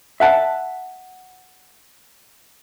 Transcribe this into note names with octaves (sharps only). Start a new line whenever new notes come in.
E5 F#5 A5